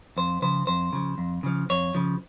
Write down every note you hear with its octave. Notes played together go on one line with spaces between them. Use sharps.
F2 C5
C#3 F3 C5
F2 C5
C#3 F3
F2
C#3 F3
F2 C#5
C#3 F3